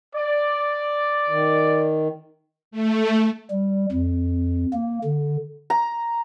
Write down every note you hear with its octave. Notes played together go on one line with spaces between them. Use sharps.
D5
D#3
A3
G3
F2
A#3
D3
A#5